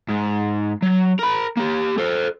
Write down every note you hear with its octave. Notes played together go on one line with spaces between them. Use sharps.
G#2
F#3
A#4 B5
A#3 G4
A4 C5